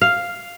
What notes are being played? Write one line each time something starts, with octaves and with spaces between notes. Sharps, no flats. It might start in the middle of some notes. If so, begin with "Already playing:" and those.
F5